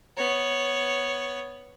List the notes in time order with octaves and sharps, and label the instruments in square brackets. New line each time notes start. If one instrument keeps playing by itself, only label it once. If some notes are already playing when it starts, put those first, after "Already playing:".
[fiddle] B3 C#5